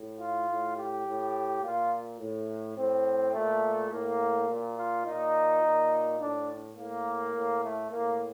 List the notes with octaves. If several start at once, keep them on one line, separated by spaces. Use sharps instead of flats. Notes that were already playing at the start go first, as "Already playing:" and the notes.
Already playing: A2
F4
A2
G4
A2
A#2 F4
A2
A2 C4
A#2 A3
A2 A#3
A#2
F4
A#2 D#4
A#2
A2 D4
A2 A#3
A2
A3
A2 A#3